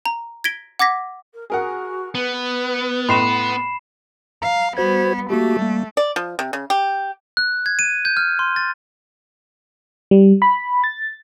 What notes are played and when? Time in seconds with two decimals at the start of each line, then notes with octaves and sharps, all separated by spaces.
0.06 A#5
0.44 G#6 A#6 B6 D7 G7
0.79 F#5 D6 G#6 A#6 B6
1.34 A#4
1.50 F#4 G#4 A#4 F#5
2.15 B3 B4
3.09 A2 D#5 B5 C6 C7 E7
4.42 F5 A#5
4.77 G3 B3 F#4 C5 G#6
5.30 A3 A#3 F#4 G4
5.59 G3 A#3
5.97 D5
6.16 F3
6.39 C3
6.53 C#3
6.70 G4
7.37 F#6
7.66 G#6
7.79 D#7
8.05 G6
8.17 F6
8.39 C6
8.56 A6
10.11 G3
10.42 B5
10.84 A6